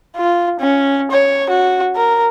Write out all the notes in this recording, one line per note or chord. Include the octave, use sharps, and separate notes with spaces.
F4
C#4
C#5
F#4
A#4